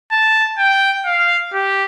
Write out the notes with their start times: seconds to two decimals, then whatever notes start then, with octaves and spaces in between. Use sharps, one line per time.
0.11 A5
0.58 G5
1.06 F5
1.53 G4